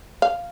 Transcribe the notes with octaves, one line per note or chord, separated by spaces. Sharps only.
F5